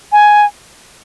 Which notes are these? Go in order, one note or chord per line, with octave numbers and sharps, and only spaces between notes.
G#5